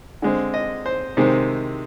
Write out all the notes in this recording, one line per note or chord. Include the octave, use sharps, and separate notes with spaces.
D3 G#3 C4
D#5
C5
C3 D#3 G#3 C4